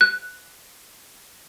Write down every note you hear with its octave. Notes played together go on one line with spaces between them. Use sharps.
F#6